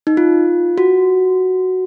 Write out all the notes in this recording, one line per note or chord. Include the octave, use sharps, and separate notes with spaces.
D#4
F4
F#4